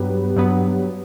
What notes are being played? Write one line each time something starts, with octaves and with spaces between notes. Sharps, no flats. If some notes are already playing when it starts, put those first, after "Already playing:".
Already playing: G2 F#3 B3 G4 B4
G2 F#3 B3